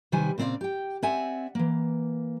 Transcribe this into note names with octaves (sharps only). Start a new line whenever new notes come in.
C3 D#3 G3 B4 G#5
A#2 C#3 C4 D#4 D5 F5
G4 G5
C4 D5 E5 F#5 G#5
E3 A#3